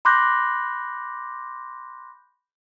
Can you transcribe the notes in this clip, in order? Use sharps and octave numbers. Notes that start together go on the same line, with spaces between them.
B5 C6 D6 F#6 G6 A#6